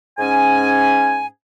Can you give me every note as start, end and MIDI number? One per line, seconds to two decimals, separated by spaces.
0.19 1.26 44
0.19 1.26 61
0.19 1.26 80